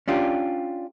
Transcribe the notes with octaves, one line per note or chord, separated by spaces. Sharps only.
C#4 D4 F4 G4